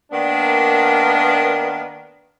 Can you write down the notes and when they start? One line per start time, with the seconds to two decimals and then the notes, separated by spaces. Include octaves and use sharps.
0.12 D#3 A#3 B3 D4